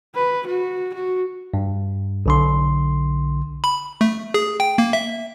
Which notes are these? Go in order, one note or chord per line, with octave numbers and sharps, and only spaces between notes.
B4
F#4
F#4
G2
B1 D3 C6
B5
A3
G#4
G5
A#3
E5